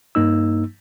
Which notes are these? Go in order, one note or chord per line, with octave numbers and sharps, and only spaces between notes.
G2 A#3 D#4 E6